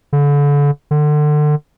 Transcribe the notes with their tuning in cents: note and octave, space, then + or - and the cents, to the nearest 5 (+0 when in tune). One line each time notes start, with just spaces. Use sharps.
D3 -35
D3 +30